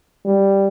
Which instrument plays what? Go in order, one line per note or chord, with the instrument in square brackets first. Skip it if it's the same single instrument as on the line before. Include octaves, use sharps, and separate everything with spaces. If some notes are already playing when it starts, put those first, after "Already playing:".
[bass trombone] G3